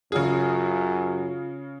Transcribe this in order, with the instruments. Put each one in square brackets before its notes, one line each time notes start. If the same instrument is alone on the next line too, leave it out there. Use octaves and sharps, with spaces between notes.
[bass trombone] F#2 [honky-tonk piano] C#3 G#4 [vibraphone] F4